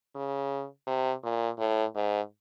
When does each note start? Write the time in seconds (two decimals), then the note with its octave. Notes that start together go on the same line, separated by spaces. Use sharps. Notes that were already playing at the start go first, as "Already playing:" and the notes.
0.15 C#3
0.87 C3
1.24 A#2
1.59 A2
1.95 G#2